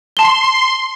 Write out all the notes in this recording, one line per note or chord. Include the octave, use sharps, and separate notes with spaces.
A5 C6 G7